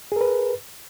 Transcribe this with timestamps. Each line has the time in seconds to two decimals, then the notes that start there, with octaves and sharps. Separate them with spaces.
0.12 G#4
0.16 A#4
0.21 B4